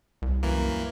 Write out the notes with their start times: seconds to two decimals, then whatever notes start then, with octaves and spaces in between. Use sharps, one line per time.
0.22 C2
0.43 F#2 E3 A#3